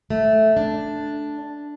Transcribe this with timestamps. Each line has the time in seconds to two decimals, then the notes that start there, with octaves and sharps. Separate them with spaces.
0.10 A3
0.57 D4